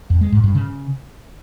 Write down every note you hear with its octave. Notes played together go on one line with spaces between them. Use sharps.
F2
G#3
G#2
G2
C#3